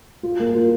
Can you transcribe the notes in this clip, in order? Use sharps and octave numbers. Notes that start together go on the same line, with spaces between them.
F4
A#3
F4